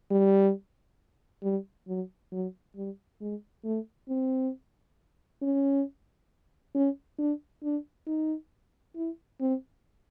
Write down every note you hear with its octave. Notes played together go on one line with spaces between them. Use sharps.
G3
G3
F#3
F#3
G3
G#3
A3
C4
C#4
C#4
D4
D4
D#4
E4
C4